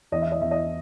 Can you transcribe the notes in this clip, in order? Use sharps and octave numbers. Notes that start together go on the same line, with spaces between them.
E2 D#5
E5
D#5
E2 E5
D#5